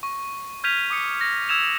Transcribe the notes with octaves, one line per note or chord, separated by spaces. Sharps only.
C#6
F6 G6 G#6 B6 D#7 F7
D6 D#6 C#7
A#6
E6 G#6 E7 F7